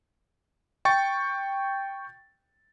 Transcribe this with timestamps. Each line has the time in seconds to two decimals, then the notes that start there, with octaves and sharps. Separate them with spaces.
0.85 G5 C#6 A6